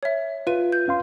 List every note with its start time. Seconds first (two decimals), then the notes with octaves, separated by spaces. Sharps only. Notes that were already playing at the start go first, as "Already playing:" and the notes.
0.03 C#5 E5
0.47 F4 B4 D#7
0.72 G6
0.88 C#4 F5 C6